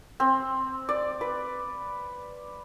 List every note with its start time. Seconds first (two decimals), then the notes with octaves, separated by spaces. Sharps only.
0.20 C4
0.89 D5
1.21 B4